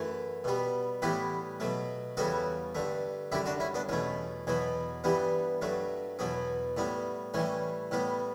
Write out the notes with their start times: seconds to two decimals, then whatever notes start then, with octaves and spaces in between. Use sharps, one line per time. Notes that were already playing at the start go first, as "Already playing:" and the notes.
Already playing: F#2 E3 A3
0.44 B2 G3 B3
1.02 A2 E3 G3 B3 G4 B4
1.60 B2 F#3 A3
2.17 E2 C#3 G3 B3 F#4 A4
2.75 G2 D3 A3
3.32 F#2 D3 G3 E4 G4
3.46 D4 F#4
3.60 C#4 E4
3.74 B3 D4
3.89 E2 B2 A3 C#4
4.47 E2 B2 F#3 B3
5.04 G2 E3 G3 B3
5.61 G2 F#3 A3
6.19 E2 B2 F#3 B3
6.77 A2 G3 B3
7.34 A2 E3 G3 C#4
7.91 A2 G3 B3